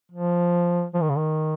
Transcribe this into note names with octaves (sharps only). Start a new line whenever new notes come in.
F3
F3
D#3
C#3
D#3